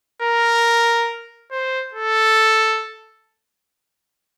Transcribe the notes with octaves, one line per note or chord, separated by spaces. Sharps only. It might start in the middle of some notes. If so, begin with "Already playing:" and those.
A#4
C5
A4